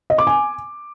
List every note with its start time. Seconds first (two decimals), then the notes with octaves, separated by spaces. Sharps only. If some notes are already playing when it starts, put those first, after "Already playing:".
0.10 D#5
0.18 D6
0.27 G#5